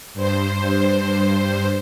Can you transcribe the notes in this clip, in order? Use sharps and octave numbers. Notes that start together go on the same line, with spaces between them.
G2 C5